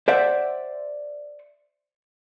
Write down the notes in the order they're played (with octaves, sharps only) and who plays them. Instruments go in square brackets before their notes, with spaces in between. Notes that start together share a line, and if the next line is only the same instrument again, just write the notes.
[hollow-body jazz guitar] C5 D5 E5 F#5